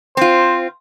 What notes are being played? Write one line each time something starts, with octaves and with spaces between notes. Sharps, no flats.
C4 F4 C5